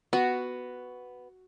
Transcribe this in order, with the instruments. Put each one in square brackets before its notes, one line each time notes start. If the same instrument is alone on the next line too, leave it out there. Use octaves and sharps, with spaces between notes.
[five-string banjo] B3 [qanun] F#4